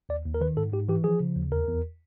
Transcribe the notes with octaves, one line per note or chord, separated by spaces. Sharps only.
D#2 D5
D#2
A#4
D#3 B4
G#2 A4
G#2 G4
E3 G4
F3 G#4
C#3
D#2
E2 A#4
E2